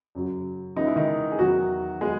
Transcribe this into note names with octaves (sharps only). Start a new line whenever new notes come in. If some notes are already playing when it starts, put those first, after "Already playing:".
F#2 C#3 F#3
C#3 E3 G#3 B3 D#4
E4
D#3 D#4
G#4
E2 D#3 F#3 F#4
F#3 G#3 B3 G#4